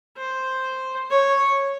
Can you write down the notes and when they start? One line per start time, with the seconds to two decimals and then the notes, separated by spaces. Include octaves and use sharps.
0.17 C5
1.10 C#5